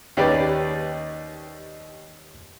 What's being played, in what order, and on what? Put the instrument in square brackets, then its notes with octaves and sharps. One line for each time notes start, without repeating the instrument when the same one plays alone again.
[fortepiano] D#2 C#4 G4 B4 D5